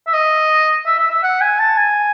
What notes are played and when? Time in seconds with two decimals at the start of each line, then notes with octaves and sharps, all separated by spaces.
0.07 E5
0.13 D#5
0.86 E5
0.98 E5
1.11 E5
1.23 F#5
1.41 G#5
1.59 A5
1.77 G#5